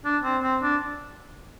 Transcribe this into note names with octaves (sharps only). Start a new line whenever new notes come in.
D4
C4
C4
D4